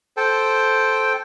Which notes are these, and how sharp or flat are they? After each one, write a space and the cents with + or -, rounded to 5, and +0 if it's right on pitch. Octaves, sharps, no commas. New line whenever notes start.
A4 -5 C5 +0 G5 +0